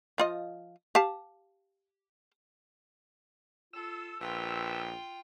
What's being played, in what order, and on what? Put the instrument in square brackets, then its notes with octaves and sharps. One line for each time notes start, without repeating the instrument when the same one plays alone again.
[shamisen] F3 F4 D#5
G4 F5 A5
[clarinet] F4 [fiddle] A4 [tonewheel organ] E6
[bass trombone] A#1 [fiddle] F4 G5 [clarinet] B4